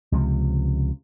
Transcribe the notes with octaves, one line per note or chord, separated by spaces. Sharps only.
C#2 C3 F3